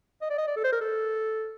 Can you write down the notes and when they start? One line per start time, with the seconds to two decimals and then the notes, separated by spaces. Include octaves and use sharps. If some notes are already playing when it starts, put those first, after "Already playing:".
0.22 D#5
0.30 D5
0.38 D#5
0.47 D5
0.56 A4
0.64 C5
0.72 A#4
0.81 A4